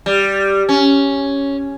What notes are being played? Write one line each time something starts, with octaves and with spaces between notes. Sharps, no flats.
G3
C#4